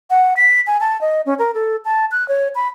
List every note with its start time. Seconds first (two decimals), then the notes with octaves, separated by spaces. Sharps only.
0.10 F#5
0.37 B6
0.67 G#5
0.80 A5
1.01 D#5
1.26 C#4
1.39 A#4
1.54 A4
1.85 A5
2.12 F#6
2.28 C#5
2.55 B5